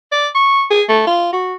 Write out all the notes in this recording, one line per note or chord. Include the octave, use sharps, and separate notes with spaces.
D5
C#6
G#4
A3
F4
F#4